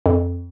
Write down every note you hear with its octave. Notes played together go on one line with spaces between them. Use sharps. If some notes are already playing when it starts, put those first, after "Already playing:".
F2